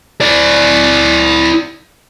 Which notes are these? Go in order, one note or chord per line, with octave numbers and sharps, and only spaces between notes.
E4 D5